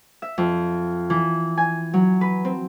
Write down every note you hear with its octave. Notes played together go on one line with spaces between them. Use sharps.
E5
F2
E3
G#5
F#3
B4
C4